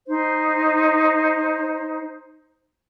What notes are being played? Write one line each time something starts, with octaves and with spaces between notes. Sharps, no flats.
D#4 C5